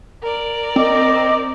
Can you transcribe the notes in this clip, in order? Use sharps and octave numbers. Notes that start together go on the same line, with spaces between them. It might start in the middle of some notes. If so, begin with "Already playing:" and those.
A#4 D5
C4 D#5 D6